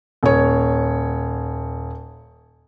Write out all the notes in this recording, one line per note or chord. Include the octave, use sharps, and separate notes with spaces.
D#1 C#5